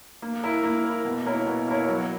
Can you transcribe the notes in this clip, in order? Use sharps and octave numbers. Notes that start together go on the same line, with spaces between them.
A#3
E4 A#4
A#3
E4 A#4
B2
A#3 E4 A#4 C#5
B2
A#3 E4 A#4 C#5
F#3